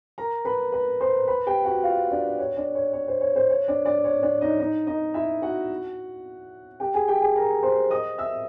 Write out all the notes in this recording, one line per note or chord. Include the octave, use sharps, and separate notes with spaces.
A#4 A#5
B4 B5
B4 B5
C5 C6
B4 B5
G4 G5
F#4 F#5
F4 F5
D4 D5
C#5
D4 D5
C#5
C#5
C5
C#5
C5
C#5
D4 D5
D4 D5
C#5
D4 D5
D#4 D#5
D#4 D#5
D#4 D#5
E4 E5
F#4 F#5
G4 G5
G#4 G#5
G4 G5
G#4 G#5
A#4 A#5
C5 C6
D#5 D#6
E5 E6